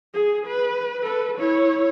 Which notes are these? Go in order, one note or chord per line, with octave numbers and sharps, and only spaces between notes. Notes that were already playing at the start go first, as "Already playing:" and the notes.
G#4
B4
A4 B4
E4 C#5